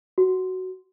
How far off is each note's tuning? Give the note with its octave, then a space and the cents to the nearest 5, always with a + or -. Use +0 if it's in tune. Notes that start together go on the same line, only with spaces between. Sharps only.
F#4 +10